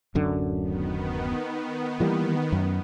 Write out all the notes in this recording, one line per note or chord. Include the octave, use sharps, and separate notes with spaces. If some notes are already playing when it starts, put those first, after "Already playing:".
D1 F#2 D3
D#3 B3
E3 G3 A#3
F#2